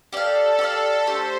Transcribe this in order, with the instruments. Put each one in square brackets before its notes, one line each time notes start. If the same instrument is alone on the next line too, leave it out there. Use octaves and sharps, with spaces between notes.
[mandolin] G4 D5 F5 [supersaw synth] A4
[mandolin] G4 D5 F5
[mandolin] A3 D4 G4 [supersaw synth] C5